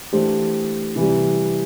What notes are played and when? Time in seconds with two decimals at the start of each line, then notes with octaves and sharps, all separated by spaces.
0.13 E3 A3 D4 G4 C5
0.96 C3 E3 G3